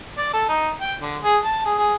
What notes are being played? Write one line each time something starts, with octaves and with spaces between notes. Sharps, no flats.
D5
A4
D#4
G5
D3
G#4
A5
G#4
G#4